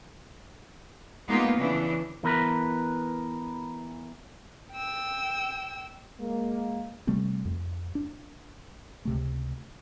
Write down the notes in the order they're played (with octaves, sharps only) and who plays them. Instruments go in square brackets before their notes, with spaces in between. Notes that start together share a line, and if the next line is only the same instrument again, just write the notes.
[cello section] G#3 A#3 B3 D#4 F4
C#3 E3 D4
[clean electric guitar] E3 B3 A#4 B4
[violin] G5 E6
[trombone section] G#3 A#3
[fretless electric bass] C3 G3 A3 C4
F2
D4
C#2 C3 A3